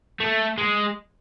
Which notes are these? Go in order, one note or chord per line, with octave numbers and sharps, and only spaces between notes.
A3
G#3